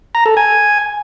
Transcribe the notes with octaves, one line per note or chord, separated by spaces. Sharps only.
A#5
A4
G#5